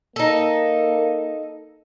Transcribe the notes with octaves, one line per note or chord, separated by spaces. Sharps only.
A#3 D#4 A4